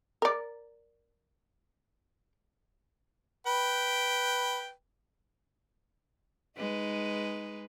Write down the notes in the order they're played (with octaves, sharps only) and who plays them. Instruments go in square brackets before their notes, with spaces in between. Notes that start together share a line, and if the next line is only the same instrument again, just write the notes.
[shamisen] A#4 D5
[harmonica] B4 G5
[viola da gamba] G#3 D#4 B4